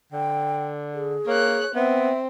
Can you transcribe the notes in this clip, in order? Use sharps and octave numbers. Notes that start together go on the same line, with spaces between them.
D3 G5
G#4
A#3 C#5 F#6
B3 C4 E5